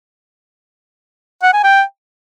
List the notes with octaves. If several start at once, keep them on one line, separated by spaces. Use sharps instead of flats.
F#5
G#5
G5